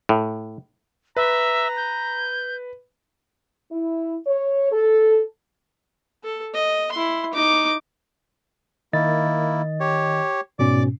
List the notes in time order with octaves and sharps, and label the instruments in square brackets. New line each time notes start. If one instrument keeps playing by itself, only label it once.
[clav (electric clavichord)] A2
[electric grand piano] B4 [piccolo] E5 [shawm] A#5
[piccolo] G6
[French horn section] E4
C#5
A4
[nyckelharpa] A4
D#5
E4 C6
D#4 D6
[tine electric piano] D#3 D#5 A6 [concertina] A#3 E4
[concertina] G4 C#5
[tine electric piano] G#2 B2 C#4 [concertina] D5 D6